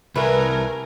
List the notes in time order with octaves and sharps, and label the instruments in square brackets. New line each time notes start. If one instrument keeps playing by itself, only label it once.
[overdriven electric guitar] C2 E5 [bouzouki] E3 A3 B4 [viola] A#4 G#5